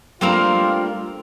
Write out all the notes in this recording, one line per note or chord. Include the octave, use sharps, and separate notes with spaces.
G3 A3 A#3 C4 D4 F4 A#4